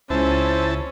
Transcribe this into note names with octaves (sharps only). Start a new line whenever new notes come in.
C#2 C#4 E4 C5 A5